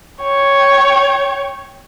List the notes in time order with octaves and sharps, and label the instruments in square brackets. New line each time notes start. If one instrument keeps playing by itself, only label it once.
[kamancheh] C#5 G5